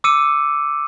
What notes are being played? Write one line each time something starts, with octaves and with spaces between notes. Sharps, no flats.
D6 E6 C#7 D#7